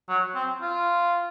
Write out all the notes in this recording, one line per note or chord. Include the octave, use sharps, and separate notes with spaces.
F#3
C4
F4